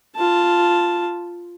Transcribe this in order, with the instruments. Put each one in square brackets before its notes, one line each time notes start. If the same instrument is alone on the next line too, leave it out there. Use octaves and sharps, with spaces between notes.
[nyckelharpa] F4 A5